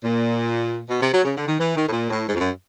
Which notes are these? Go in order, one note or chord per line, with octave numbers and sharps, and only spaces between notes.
A#2
B2
C3
F#3
C#3
D3
D#3
E3
D#3
A2
A#2
A2
G#2
F2
F#2